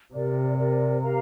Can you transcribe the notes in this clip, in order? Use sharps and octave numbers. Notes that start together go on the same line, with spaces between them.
C3 G4 A#4 D5
G4 A#4 D5
G4 A#4 F5 A#5